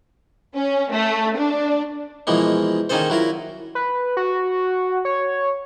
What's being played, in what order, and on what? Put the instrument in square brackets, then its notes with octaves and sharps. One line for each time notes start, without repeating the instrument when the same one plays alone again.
[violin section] C#4
A3
D4
[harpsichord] B2 E3 F3 G#3 A#3
D#3 A#3 C#4 G#4 A4 C5
F#3 E4 F4 A#4
[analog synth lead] B4
F#4
C#5